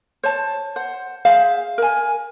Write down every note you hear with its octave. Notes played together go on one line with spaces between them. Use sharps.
C5 C#5 A5
C5 F#5
G#4 C5 E5 F5
A#4 G#5